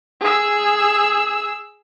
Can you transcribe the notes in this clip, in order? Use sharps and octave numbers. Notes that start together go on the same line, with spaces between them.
G#4 E6